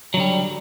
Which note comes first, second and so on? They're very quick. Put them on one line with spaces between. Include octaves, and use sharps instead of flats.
F#3 D3 G3